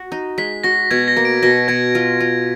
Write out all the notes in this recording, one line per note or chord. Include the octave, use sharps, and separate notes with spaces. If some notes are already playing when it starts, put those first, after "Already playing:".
Already playing: F#4
D#4
G#3 B6
F#4 A#6
B2 G#6
A#6
A#3
D7
B2 A#6
B2 G#6
F4
F4